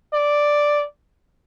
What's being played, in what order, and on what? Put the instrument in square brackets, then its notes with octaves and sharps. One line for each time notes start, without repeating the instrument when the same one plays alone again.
[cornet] D5